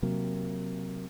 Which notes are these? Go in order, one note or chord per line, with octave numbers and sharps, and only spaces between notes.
C3 F#3 A#3